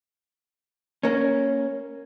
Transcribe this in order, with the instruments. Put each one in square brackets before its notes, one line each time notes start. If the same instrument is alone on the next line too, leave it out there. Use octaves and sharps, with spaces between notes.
[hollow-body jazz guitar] A#3 C#4